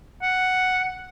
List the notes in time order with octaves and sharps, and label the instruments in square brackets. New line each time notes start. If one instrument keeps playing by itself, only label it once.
[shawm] F#5